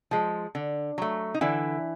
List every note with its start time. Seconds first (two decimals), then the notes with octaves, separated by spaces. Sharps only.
0.11 F3 G#3
0.55 D3
0.98 F#3 A3
1.34 D#4
1.41 D3 E3 E4